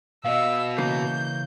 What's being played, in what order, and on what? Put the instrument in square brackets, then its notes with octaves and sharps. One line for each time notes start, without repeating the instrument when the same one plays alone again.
[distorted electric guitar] B2 [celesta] D#5 F5 [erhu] E6
[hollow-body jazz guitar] C#3 E3 A#3 [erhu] G6